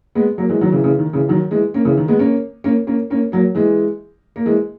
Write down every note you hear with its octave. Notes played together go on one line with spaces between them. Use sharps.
G#3 B3
F#3 A#3
E3 G#3
D#3 F#3
C#3 E3
C#3 E3
D#3
C#3 E3
D#3 F#3
E3 G#3
A#3 C#4
C#3 E3
D#3
G#3 B3
A#3 C#4
A#3 C#4
A#3 C#4
A#3 C#4
F#3 A#3
E3 G#3
A#3
E3 G#3